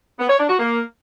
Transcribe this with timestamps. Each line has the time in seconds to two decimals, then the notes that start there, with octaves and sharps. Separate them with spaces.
0.19 B3
0.29 C#5
0.39 D4
0.49 F#4
0.59 A#3